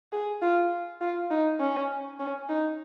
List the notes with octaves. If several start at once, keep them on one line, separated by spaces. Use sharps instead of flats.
G#4
F4
F4
D#4
C#4
C#4
D#4